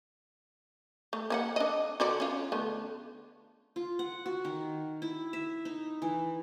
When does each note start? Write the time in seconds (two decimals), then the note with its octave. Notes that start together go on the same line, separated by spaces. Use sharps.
1.13 A3
1.30 A#3 B4 F#5
1.56 D4 D#5
2.00 D3 F#4 D5
2.20 C#4 F4
2.52 D3 A3 B3
3.76 F4
3.99 F#5
4.26 F#4
4.45 D#3
5.02 E4
5.33 E5
5.65 D#4
6.02 E3